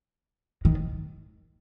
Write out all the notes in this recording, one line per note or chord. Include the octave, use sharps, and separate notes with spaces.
D#3